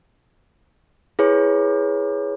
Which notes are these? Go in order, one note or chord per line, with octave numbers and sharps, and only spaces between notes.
E4 G#4 B4 C#5